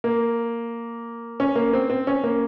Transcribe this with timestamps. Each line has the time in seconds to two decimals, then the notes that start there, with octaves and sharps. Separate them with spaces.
0.04 A#3
1.40 C#4
1.55 A#3
1.73 C4
1.90 C4
2.07 C#4
2.24 A#3